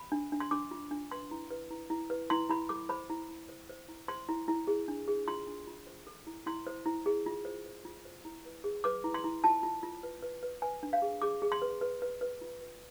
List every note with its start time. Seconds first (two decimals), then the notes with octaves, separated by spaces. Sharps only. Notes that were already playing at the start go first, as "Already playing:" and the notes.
Already playing: B5
0.12 D4
0.32 D4
0.40 C6
0.51 D4 D6
0.71 F4
0.91 D4
1.11 B4 C6
1.31 E4
1.51 B4
1.71 E4
1.90 E4
2.10 B4
2.30 E4 C6
2.49 E4 B5
2.69 A4 D6
2.89 C5 B5
3.10 E4
3.29 E4
3.49 C5
3.70 C5
3.88 E4
4.08 C5 C6
4.29 E4
4.48 E4
4.67 G#4
4.88 D4
5.08 G#4
5.28 F4 C6
5.47 D4
5.67 F4
5.87 C5
6.07 A4
6.27 E4
6.46 E4 C6
6.67 C5
6.86 E4
7.06 G#4
7.26 F4
7.45 C5
7.66 C5
7.85 F4
8.05 C5
8.25 E4
8.45 B4
8.64 G#4
8.84 B4 D6
9.04 E4
9.14 C6
9.24 E4
9.44 F4 A5
9.63 F4
9.83 F4
10.03 B4
10.22 B4
10.43 B4
10.62 B4 G#5
10.83 D4
10.93 F5
11.02 G#4
11.22 G#4 D6
11.42 G#4
11.52 C6
11.62 B4
11.81 B4
12.02 B4
12.21 B4
12.41 F4
12.61 B4